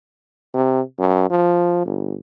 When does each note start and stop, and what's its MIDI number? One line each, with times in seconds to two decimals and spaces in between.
0.54 0.81 48
0.99 1.30 42
1.30 1.82 53
1.85 2.15 31